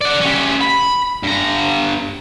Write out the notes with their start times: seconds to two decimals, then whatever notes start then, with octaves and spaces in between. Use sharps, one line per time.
0.01 D5 F#5
0.21 C#4 G4
0.61 B5
1.23 G2 A#5